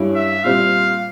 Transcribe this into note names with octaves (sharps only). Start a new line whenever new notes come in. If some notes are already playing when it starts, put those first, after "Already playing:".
Already playing: G2 G3 C#4 E4
E5
A#2 G3 C4 F5